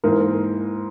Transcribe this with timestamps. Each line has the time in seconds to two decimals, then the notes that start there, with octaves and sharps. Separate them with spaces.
0.04 G#2 E3 A#3 A#4
0.21 A#4